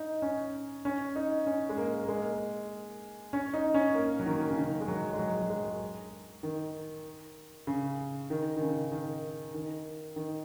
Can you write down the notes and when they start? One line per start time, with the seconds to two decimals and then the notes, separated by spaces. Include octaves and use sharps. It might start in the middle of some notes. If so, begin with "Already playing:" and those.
Already playing: D#4
0.22 C#4
0.85 C#4
1.16 D#4
1.47 C#4
1.69 G#3
1.78 A#3
2.05 A#3
2.09 G#3
3.33 C#4
3.54 D#4
3.74 C#4
3.95 A#3
4.20 F#3
4.26 D#3
4.50 C#3
4.57 D#3
4.81 G#3
4.88 F#3
5.13 G#3
5.19 F#3
5.42 F#3
5.50 G#3
6.43 D#3
7.67 C#3
8.30 D#3
8.57 D#3
8.61 C#3
8.91 D#3
9.54 D#3
10.16 D#3